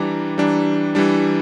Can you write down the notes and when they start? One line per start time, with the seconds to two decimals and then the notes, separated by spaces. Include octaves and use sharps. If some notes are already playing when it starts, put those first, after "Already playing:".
Already playing: E3 G3 D4 A#5 D6
0.38 E3 G3 D4
0.95 E3 G3 D4